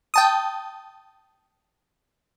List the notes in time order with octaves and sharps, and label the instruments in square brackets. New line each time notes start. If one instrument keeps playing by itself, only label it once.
[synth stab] G5 A5 D#6